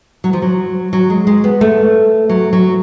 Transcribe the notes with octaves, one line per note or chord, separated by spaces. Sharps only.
F#3
F3
F#3
F#3
G#3
G#3
B3
A3
F#3
F#3